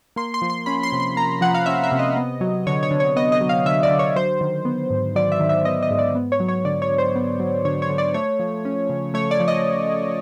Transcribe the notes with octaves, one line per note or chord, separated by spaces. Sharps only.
A#3 C6
C6
F3
C6
C#4 B5
C6
C3
C6
A#3 A#5
F3 F#5
F5
C#4 E5
E5
C3
D#5
B3
F#3
D3 C#5
C#5
D3
C#5
B3 D#5
D#5
F#3
F5
D3 E5
D5
D3
C#5
F#3 C5
D#3
B3
G#2
F#3 D5
E5
D#3
E5
B3 D#5
D#5
G#2
D5
B3
C#5
F#3
C#5
D3 D5
C#5
D3
C5
B3
F#3
D3 C#5
C#5
D3
D5
A3 C#5
F3
C#4
C#3
A3 C#5
D5
F3
D#5